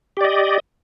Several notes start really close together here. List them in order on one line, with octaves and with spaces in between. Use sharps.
G4 D5 D#5